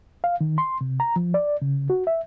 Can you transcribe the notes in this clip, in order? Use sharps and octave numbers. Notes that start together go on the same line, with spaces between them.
F5
D#3
C6
C3
A#5
F3
D5
C#3
F#4
E5